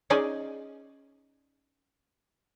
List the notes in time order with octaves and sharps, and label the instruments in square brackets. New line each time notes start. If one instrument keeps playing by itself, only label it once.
[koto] C#4 D#4 G#4 D5 D#5 G#5